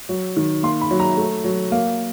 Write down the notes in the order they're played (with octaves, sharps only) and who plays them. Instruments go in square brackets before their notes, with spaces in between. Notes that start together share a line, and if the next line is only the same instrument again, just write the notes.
[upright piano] F#3
D#3
A#3 C6
B5
F#3
A#5
A3
F#3
A#3